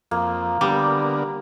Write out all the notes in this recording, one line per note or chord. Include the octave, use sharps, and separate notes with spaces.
F2 A#3
D3 G3 B3 A#4 D6